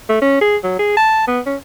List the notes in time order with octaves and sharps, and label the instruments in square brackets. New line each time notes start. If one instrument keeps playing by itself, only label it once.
[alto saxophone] A3
C#4
G#4
F#3
G#4
A5
B3
C#4